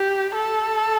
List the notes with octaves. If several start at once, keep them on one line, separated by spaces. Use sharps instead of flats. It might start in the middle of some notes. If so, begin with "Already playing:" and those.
Already playing: G4
A4